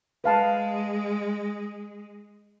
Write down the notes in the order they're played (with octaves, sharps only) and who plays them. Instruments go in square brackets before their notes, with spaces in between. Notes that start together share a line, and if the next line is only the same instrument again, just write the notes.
[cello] G#3 [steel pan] B4 F5 A5